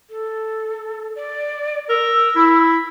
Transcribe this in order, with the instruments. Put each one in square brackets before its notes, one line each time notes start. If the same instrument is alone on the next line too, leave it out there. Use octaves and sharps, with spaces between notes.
[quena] A4
D5
[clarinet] A#4 [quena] E6
[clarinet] E4